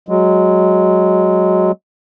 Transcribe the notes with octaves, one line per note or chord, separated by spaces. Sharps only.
F#3 G#3